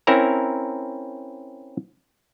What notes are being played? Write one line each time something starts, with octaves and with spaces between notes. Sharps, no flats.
C4 C#4 E4 A#4 E5 A#5